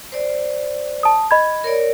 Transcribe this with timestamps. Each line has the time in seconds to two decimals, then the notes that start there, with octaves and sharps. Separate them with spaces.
0.12 C5 D5
1.03 A5 D#6
1.31 D#5 B5 G#6
1.64 A#4 C#5 D5